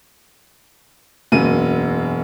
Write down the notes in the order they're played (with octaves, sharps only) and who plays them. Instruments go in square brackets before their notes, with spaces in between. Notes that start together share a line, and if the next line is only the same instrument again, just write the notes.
[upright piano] E1 F#2 A#3 D#7